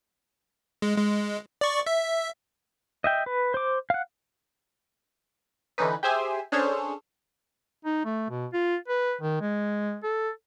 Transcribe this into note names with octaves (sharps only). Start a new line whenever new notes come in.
G#3
G#3
D5 C#6
E5
D#5 E5 G5
B4
C5 D6
F5 F#5
D3 E3 C#4 D#4 B4
G4 G#4 C5 E5 G#5
C#4 D4 G#4 A4 C5 C#5
D#4
A3
B2
F4
B4
D#3
G#3
A4